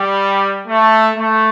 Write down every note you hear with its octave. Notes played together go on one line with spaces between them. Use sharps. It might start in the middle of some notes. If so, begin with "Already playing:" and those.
Already playing: G3
A3
A3